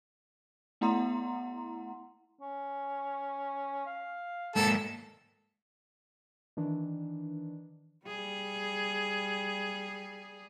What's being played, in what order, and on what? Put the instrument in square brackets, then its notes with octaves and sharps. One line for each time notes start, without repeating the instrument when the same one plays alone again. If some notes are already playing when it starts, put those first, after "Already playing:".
[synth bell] A3 B3 E4 F#5 A#5 C6
[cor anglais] C#4
F5
[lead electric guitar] G#2 A#3 [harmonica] A4
[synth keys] D#3 E3 D4
[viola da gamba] G3 G#4